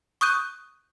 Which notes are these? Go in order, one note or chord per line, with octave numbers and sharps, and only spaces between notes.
C#6 D#6 F#6 G6 D#7